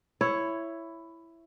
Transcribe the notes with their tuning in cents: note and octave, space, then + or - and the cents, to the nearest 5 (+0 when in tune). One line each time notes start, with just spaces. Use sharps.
E4 +10 C#5 +0